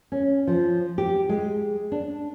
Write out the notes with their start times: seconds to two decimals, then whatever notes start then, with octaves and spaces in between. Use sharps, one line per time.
0.12 C#4
0.47 F3
0.98 G4
1.29 G#3
1.92 D4